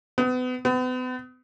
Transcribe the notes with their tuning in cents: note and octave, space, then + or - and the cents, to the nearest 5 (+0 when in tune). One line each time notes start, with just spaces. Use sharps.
B3 +35
B3 +40